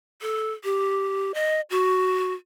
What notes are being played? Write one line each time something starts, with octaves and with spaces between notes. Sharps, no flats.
A4
G4
D#5
F#4